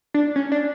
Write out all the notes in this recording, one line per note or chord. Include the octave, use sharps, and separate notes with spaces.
D4
C#4
D4